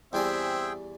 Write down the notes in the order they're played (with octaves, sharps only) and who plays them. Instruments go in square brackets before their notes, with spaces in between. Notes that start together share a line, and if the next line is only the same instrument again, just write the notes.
[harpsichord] E2 G3 G#5 [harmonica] C4 E5 [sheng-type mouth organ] G#4 G5